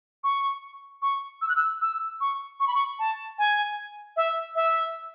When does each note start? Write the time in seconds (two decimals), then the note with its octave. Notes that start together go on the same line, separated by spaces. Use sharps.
0.24 C#6
1.02 C#6
1.42 E6
1.49 F#6
1.56 E6
1.82 E6
2.21 C#6
2.60 C#6
2.68 B5
2.74 C#6
2.99 A5
3.38 G#5
4.16 E5
4.55 E5